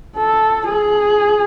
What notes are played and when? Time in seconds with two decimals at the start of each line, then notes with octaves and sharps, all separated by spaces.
0.17 A4
0.68 G#4